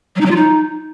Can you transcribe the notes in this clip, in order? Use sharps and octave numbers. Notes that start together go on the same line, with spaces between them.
F#3
D#4
F#3
F4
D#4